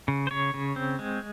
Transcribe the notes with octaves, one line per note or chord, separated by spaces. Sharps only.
C#3
C5
C#3 C#5
C#3
C4
G#3